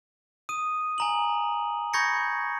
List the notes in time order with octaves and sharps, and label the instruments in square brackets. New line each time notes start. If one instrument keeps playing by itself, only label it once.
[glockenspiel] D#6 D#7
G#5 A#5 F#7
B5 C#6 G6 G#6 A#6 C#7